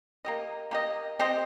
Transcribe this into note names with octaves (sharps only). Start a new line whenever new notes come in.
A#3 G4 D#5
A#3 G4 D#5
C4 G4 C5 D#5